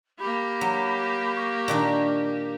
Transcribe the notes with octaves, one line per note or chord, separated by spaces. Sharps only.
A#3 G4 B5
F#3
C#6
A#2 D#3 D4